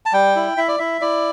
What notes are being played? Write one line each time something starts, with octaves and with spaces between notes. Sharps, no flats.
A5
G3 G5
E4
E4 E5
D5
E4 E5
E4 D5